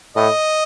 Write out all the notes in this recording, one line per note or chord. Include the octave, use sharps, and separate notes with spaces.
A2 D#5